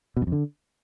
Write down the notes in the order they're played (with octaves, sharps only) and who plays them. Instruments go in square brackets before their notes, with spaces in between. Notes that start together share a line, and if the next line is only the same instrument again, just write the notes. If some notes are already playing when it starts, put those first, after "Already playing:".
[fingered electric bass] B2
F#2
F2
D3